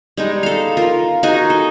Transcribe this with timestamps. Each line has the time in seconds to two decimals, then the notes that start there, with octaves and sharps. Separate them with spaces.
0.17 G3 G#3 D#4
0.43 A4 F5
0.77 F4 A#4
1.23 D#4 F#4 G#4 G#5
1.50 A4